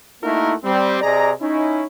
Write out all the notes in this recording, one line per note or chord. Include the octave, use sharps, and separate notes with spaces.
A3 A#3 D#4 E4 F#4 A#4
G3 C4
C3 G#4 D5 D#5 A#5
C#4 D#4 E4